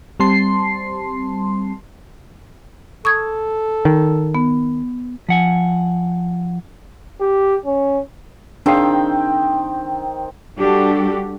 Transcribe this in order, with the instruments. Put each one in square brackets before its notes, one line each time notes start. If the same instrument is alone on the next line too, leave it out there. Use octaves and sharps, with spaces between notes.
[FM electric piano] G3 C4 A5 C6 C7
[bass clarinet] A4 [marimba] C#6 D#6 G#6
[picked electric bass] D#3
[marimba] B3
[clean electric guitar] F3 F#5 G#5
[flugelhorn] G4
C#4
[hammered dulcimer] D#3 C4 G5 [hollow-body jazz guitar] D4 G#4 F5
[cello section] G3 D4 F#4 G4 A4